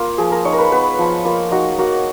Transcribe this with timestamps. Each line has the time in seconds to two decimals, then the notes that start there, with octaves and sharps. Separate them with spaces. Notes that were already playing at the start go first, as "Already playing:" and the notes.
Already playing: A#3 F4
0.18 F3 G#4
0.32 A#4
0.45 D#4 C#5
0.53 A#4
0.58 B4
0.72 B3 B4
0.99 F3
1.25 A#3 F4
1.51 D#4 F#4
1.78 A#3 F#4